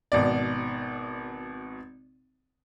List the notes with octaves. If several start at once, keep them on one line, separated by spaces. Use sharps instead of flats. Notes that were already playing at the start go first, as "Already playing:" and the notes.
G#1 B2 D5